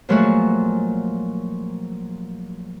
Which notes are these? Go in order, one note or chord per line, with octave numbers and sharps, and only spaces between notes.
A#2 F3 F#3 G#3 A3 F#4